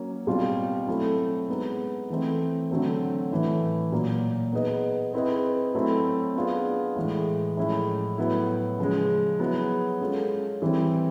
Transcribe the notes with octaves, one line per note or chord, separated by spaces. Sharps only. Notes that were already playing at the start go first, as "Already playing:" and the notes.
Already playing: F#3 A#3 C#4
B2 G3 C4 F4
F#3 A3 C4 E4 A4
G#3 B3 D#4
E3 A3 C4
D3 F#3 A3 C4
A2 E3 A3
A#2 F#3 A#3
B3 D#4 G#4 B4 D#5
C4 E4 G#4 B4 D#5
F#3 A3 C4 E4
B3 D4 F4 G#4
A2 E3 G#3
A2 F3 G#3 C#4 E4
A2 F#3 B3 E4
C#3 F3 G#3
F#3 B3 E4 G#4
G#3 C#4 F4 A4
E3 G3 C4 E4